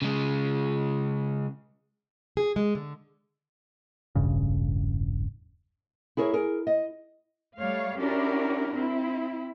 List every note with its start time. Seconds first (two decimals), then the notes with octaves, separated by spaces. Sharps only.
0.02 C#3 G#3
2.37 G#4
2.56 G#3
2.75 D3
4.15 E1 A1 G2 C#3
6.17 E4 G#4 A#4 C#5
6.33 G#4 A#4
6.67 D#5
7.58 G3 A3 C#5 F5
8.00 C#4 D4 E4 F#4 G4 A#4
8.72 C4 E4